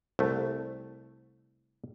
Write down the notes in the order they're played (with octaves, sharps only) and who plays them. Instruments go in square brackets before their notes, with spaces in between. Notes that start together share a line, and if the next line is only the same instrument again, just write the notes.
[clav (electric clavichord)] C2 A3